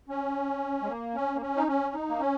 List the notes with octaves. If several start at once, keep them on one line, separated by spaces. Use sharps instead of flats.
C#4
G#3
A#3
C#4
A#3
C#4
D#4
C#4
D#4
A#3
C#4